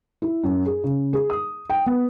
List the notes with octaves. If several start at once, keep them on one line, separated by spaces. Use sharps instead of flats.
E4
F#2
G#4
C#3
G#4
D#6
G5
B3